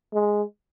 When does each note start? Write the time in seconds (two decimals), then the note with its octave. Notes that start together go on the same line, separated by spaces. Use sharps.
0.13 G#3